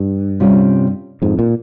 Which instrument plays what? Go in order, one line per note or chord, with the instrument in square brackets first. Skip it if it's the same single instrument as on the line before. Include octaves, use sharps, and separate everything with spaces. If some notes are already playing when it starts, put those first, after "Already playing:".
Already playing: [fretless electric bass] G2
[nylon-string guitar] C3 G3 C#4 F4
[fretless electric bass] F2 G#2
A#2